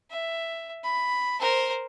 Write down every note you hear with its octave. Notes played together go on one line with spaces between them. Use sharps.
E5
B5
A#4 C5